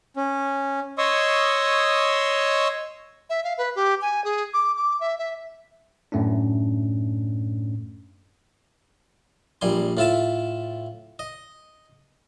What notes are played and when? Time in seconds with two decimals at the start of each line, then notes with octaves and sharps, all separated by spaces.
0.16 C#4
0.98 C#5 D#5 C6 C#6 D#6 E6
3.30 E5
3.44 F5
3.58 B4
3.76 G4
4.02 G#5
4.24 G#4
4.54 D6
4.77 D6
5.00 E5
5.18 E5
6.12 F#2 A2 A3 C#4 D4
9.61 A#1 G3 G#5 C6
9.97 A2 F4 E5 A5
11.19 D#5